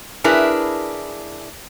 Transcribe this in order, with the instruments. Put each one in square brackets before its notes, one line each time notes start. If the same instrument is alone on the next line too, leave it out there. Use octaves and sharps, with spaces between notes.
[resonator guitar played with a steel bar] D4 E4 G#4 A#4 B4